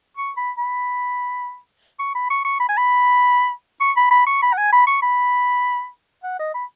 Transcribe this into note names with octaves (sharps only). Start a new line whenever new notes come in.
C#6
B5
B5
C#6
B5
C#6
C#6
B5
G#5
B5
C#6
B5
B5
C#6
B5
F#5
G#5
B5
C#6
B5
F#5
D#5
B5